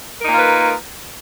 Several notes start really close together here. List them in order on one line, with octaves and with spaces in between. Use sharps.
A#4 D#4 A#3 F4 B4